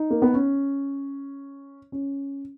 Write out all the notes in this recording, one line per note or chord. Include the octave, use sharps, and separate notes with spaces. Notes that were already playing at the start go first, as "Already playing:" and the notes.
Already playing: D#4
A#3
B3
C#4
C#4